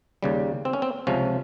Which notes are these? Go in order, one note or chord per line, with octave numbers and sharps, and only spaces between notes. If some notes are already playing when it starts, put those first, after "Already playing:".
D#2 C#3 G3
C4
C#4
C4
C#2 C3 F3 C#4